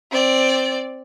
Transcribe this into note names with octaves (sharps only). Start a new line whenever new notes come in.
C4 D5